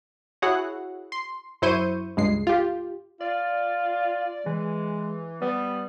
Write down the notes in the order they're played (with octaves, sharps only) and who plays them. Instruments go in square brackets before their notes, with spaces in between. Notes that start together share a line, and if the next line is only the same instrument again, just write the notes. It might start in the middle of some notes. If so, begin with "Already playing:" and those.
[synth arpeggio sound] E4 F#4 G#4 C#5 F#5
C6
F#2 E4 C5 C#6 G6 D#7
C#2 G2 G#3 C7
F4 G4
[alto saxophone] F4 [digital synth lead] D5
[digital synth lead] E3 [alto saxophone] G#3
[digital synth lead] G3 [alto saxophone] B3